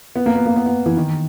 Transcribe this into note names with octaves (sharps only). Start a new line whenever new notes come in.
B3
A#3
B3
A#3
B3
B3
E3
D#3